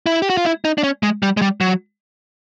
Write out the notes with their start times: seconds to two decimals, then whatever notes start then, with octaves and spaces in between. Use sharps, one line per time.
0.06 E4
0.22 G4
0.30 F#4
0.37 F4
0.45 E4
0.65 D#4
0.78 D4
0.83 C#4
1.03 G#3
1.23 G3
1.37 G#3
1.42 G3
1.61 F#3